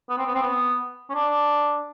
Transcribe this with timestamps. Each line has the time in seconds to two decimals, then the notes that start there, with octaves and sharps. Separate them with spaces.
0.09 B3
0.18 C4
0.26 B3
0.34 C4
0.42 B3
1.09 C#4
1.14 D4